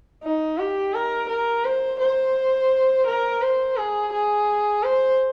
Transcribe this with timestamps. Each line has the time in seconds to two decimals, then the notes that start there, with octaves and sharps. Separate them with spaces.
0.23 D#4
0.58 G4
0.94 A#4
1.29 A#4
1.65 C5
1.99 C5
3.06 A#4
3.42 C5
3.76 G#4
4.12 G#4
4.83 C5